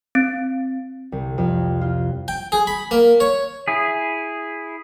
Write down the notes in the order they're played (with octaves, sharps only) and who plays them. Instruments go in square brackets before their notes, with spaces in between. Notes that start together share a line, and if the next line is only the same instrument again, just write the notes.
[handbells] C4
[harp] C2
F2
F4
[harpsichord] G5
G#4
B5
A#3
C#5
[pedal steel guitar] E4 G#4